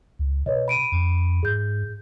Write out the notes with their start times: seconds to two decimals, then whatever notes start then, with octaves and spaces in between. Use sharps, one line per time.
0.19 C#2
0.46 B2 B4 C#5 D#5
0.68 B5 D7 D#7
0.92 F2
1.43 G#2 G#4 G6